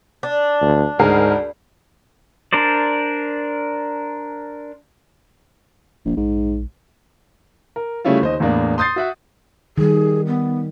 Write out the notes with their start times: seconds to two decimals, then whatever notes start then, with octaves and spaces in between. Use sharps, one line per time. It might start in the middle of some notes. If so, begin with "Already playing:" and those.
0.23 D4
0.61 D2
0.99 D2 G#2 G#4 A#4
2.53 D4 A#4 C5 D5
6.05 D#1 A#1
6.17 A#1 G#2
7.76 A#4
8.05 C#3 G3 A3 C#4 E4 F4
8.21 D#2 C5 D#5
8.40 E2 A2 A#3 D4
8.78 C6 D#6 G6 A6 C7
8.96 F#4 E5 F#5
9.78 D#3 G3 G#4
10.27 B3